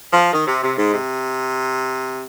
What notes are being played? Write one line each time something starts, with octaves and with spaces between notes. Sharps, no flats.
F3
D#3
C3
C3
G#2
C3